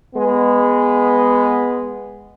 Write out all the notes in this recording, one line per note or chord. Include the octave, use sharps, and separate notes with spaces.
G#3 B3